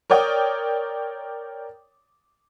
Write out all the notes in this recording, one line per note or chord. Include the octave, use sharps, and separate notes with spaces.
A#4 C#5 D5 G5 D#6